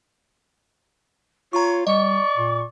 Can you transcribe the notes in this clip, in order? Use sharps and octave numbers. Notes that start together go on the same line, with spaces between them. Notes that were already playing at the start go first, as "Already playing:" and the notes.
F4 C#5 A#5 C#6
G3 D5 D#5 C#6
A#2